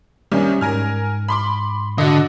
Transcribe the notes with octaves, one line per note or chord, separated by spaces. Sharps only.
C2 D#3 G3 C#4
G#2 A#4 G#5 F6
B5 C6 D6
D3 F#4 D#5